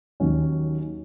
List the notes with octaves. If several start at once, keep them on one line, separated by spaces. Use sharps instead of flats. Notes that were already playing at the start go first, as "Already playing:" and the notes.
D#2 D#3 F#3 C#4